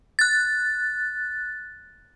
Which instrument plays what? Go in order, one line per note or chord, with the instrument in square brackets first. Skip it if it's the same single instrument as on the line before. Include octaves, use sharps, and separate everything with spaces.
[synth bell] F#6 A6